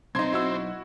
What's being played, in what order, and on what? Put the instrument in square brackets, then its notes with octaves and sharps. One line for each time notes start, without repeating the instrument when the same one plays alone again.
[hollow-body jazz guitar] B1 D#4 [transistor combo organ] C4 [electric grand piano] C6 G#6
[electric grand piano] E4 F#4 E6